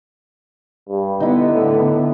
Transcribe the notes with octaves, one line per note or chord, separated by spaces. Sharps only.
G2
D3 B3 D#4 E4
A2